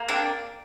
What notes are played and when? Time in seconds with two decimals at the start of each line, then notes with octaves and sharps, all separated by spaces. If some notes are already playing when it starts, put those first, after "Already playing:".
Already playing: A#3
0.08 D4 G5